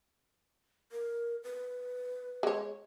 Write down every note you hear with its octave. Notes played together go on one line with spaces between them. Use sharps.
A#4
B4
G#3 C#5